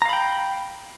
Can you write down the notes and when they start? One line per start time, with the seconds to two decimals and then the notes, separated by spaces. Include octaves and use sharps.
0.02 A#5
0.06 F5
0.09 B5
0.13 G5